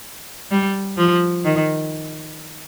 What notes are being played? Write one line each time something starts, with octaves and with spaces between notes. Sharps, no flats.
G3
F3
D#3